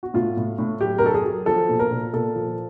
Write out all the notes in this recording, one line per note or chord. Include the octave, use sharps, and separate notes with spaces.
F#4
A2 F4
A2
A2
F#3 G4
A#4
F#3 A4
G#4
F#3
F3 A4
A#2
A#4
A#2
A#2 A4
F3